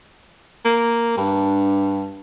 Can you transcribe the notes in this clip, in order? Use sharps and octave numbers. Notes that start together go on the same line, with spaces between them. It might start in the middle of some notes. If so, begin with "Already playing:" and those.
A#3
G2 D4